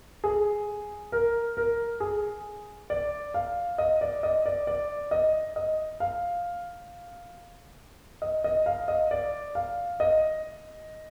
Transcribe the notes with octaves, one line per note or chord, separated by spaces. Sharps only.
G#4
A#4
A#4
G#4
D5
F5
D#5
D5
D#5
D5
D5
D#5
D#5
F5
D#5
D#5
F5
D#5
D5
F5
D#5